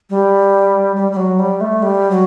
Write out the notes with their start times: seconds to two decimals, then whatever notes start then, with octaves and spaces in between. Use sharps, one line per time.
0.10 G3
0.96 G3
1.12 G3
1.16 F#3
1.39 G3
1.61 A3
1.82 G3
2.11 F#3